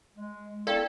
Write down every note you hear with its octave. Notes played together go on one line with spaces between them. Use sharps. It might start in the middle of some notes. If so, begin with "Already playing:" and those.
G#3
B3 D4 E4 A4 D5 F5 G5